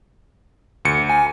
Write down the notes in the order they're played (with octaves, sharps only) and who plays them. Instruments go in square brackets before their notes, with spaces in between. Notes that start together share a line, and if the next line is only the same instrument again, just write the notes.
[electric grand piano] D2 C#7
[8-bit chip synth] G#5